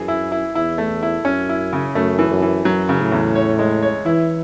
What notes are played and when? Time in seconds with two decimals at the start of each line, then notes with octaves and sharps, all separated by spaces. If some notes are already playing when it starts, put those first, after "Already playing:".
Already playing: F#2 E3 G#4
0.08 E4
0.32 E4
0.55 E2 E4
0.78 A3
1.03 E4
1.25 F#2 C#4
1.49 E4
1.73 C#3
1.95 F#2 A3
2.19 E3
2.30 F#2
2.42 E3
2.65 F#2 F#3
2.89 C#3
3.01 A2
3.12 E2
3.35 C#5
3.59 G#3
3.82 C#5
4.06 E3 E4